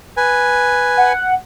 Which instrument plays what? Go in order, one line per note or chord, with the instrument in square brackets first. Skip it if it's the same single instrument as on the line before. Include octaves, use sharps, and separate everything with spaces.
[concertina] B4 G#5
[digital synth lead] F#5